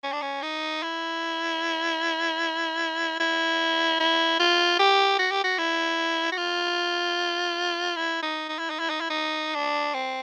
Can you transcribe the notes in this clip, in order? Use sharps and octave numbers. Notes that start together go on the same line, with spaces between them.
C#4
D4
C#4
D#4
E4
E4
E4
F4
G4
F#4
G4
F#4
E4
F#4
F4
E4
D#4
D#4
E4
D#4
E4
D#4
E4
D#4
D4
C4